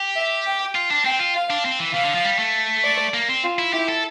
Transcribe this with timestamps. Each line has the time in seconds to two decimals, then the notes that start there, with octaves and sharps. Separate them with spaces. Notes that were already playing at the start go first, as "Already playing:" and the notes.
Already playing: G4
0.16 E5
0.46 G5
0.75 F4
0.90 D4
1.05 C4 G5
1.19 F4
1.35 F5
1.50 D4
1.65 C4
1.80 E3
1.94 E3 F5
2.05 D3
2.15 F3
2.24 G3
2.39 A3
2.84 D5
3.14 A#3
3.29 C4
3.44 F4
3.59 E4
3.73 E4 G4
3.89 A4